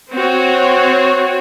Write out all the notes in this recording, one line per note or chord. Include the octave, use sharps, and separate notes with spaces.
C4 F#4 C#5